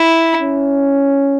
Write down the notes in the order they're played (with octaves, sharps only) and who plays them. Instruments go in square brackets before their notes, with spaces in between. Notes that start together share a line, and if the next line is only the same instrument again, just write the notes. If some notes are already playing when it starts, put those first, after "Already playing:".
Already playing: [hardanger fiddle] E4
[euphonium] C#4